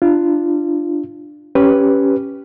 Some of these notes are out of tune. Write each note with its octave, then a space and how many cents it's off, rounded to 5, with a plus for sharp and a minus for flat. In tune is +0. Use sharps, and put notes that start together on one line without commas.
D4 +15 F4 -20
C#4 +0 G4 +0 B4 +0